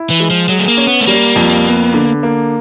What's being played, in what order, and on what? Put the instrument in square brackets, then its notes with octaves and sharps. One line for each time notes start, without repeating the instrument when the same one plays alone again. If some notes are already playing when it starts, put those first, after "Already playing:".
Already playing: [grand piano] E4
[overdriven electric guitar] E3
[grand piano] G#3
[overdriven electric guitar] F3
[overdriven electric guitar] F#3 [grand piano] G#4
[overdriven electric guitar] A3
A#3
[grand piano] C#4
[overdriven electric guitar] B3
A3
[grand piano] G3 [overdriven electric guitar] A#3
[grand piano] F2
B3
D3
A#3